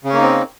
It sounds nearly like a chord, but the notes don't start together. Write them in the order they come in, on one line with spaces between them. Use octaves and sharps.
C#3 C#4 A#3 D#4 C4